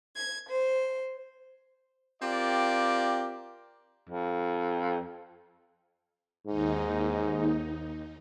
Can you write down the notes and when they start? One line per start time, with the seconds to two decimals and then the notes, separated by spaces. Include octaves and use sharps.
0.15 G#6
0.49 C5
2.22 C4 F4 G4 A#4 D5
4.10 F2
6.47 D#2 G#2 D#4